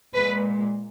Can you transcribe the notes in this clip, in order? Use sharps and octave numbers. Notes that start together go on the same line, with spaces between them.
A#2 G#3 B4